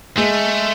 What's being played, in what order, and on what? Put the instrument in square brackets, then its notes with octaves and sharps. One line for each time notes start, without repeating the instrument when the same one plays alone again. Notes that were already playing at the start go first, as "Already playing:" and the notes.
[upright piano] G#3 [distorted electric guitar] A3